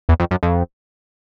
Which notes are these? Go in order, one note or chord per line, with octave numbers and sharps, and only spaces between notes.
E2
F2
F#2
F2